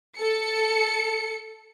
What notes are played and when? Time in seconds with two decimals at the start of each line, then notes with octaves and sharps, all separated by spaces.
0.17 A4 C#7